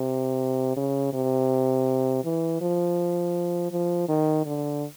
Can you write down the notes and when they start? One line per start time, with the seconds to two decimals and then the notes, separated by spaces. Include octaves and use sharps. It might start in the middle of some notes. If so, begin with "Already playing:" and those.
Already playing: C3
0.77 C#3
1.13 C3
2.25 E3
2.61 F3
3.72 F3
4.09 D#3
4.46 D3